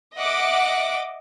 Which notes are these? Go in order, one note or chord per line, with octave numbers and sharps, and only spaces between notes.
D#5 E5 F#5 D6